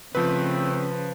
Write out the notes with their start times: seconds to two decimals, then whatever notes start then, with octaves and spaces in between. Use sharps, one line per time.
0.15 C#3 F3 A3 C4 B4